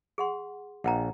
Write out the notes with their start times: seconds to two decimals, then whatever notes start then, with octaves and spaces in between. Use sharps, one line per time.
0.18 G#4 F#5 C6
0.84 A#1 F#5 G5 A#5